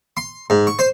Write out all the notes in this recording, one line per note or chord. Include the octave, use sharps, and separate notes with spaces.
C6
G#2
C#6
C5